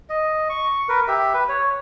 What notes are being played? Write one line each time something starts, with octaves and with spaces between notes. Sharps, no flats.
D#5
C#6
A#4 B4
G4 E5
B4
C#5